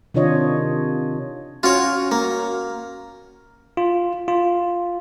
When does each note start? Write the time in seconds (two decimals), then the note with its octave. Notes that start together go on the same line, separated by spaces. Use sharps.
0.14 C3 D#3 D4 F4 C#5 D#5
1.63 C#4 F4 F#4 C#5 F6
2.12 A#3
3.77 F4
4.28 F4